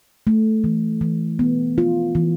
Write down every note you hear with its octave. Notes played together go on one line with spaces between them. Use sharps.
A3
E3
E3
B3
F4
E3